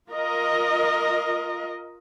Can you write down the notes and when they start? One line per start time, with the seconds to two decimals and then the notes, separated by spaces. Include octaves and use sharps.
0.11 F4 A#4 D#5